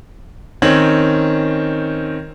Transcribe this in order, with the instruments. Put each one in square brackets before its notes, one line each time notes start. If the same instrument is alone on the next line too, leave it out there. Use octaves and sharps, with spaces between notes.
[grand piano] D#3 C4 C#4 G#6 F#7